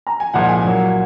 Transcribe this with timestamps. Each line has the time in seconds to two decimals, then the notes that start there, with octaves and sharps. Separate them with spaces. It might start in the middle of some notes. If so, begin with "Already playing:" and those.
0.07 A#5
0.20 G#5
0.33 C2 A#2 F3 G#3 F#5
0.49 G#5
0.64 A#2 F#3 A#3